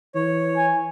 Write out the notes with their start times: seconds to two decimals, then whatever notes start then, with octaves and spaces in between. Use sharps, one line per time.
0.15 E3 C#5
0.57 G#5